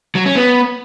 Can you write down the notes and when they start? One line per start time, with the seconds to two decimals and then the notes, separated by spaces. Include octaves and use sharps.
0.15 F#3
0.26 C#4
0.36 B3